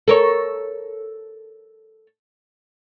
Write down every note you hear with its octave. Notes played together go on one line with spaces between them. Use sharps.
A4 A#4 C#5